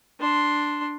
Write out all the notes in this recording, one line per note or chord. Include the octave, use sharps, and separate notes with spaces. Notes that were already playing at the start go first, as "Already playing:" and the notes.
D4 C6